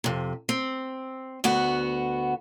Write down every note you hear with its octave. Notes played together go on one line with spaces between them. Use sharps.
F2 C3
C4
D2 B3 F#4